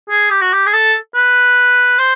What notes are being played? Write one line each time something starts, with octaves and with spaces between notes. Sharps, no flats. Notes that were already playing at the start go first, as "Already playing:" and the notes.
G#4
G4
F#4
G4
G#4
A4
B4
C5